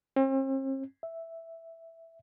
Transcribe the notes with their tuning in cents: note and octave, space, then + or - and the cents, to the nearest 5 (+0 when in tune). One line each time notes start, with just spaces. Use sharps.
C4 +45
E5 +0